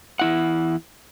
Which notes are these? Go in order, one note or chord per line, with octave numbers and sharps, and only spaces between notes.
E2 E4 F#5